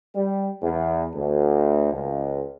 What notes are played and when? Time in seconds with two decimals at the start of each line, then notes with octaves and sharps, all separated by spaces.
0.15 G3
0.62 E2
1.15 D2
1.93 C#2